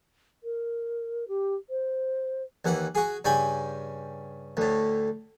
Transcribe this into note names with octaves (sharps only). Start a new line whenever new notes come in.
A#4
G4
C5
D#2 E3 F#5
F#4 G#4
G2 C#3 G5 G#5 B5
D2 A2